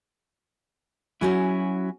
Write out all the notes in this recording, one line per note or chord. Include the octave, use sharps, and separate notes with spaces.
F#3 C#4 E4 F#4 G#5